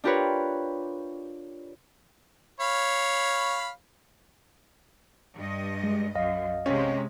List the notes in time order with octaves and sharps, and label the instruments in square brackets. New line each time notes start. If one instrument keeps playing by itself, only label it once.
[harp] D4 F4 G4 A#4 B4 C#5
[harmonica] C#5 F5 B5
[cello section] G2 D#5
[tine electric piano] G#3
[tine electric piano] B1 D#5 F5 [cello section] F#2
[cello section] C3 G#3 [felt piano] C#4